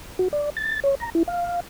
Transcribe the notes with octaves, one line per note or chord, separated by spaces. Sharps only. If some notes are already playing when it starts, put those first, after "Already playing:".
F#4
D5
A6
C#5
A#5
E4
F5